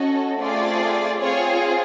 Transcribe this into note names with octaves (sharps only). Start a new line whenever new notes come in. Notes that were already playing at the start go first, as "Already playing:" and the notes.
Already playing: C#4 F#4 A4 D#5
A3 C4 F4 G#4 D5
C4 F4 G#4 C#5